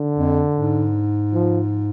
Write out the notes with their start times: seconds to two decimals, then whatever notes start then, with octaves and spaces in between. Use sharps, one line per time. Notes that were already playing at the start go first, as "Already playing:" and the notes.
Already playing: D3
0.18 F2
0.56 G#2
1.33 F3